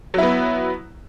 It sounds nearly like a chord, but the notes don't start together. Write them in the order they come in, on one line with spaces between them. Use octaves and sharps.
F#3 E4 B3